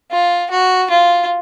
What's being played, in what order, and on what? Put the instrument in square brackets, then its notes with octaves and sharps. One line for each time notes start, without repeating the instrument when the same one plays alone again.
[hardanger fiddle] F4
F#4
F4